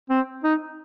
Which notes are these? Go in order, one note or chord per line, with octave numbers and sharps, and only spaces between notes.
C4
D#4